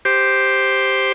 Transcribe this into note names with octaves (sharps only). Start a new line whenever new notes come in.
G4 C5